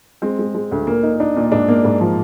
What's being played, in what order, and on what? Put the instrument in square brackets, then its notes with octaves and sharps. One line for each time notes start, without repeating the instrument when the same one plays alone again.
[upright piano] G#3 [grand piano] C4
[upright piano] G#3
G#3
D2
[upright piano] A#2 [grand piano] A#3
[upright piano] D#4
[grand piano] D4 [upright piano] D#4
[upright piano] A#2
[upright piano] G#2 [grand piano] D4
[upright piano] A#3
G#2
F3